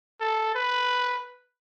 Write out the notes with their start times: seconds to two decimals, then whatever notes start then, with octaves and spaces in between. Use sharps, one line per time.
0.21 A4
0.55 B4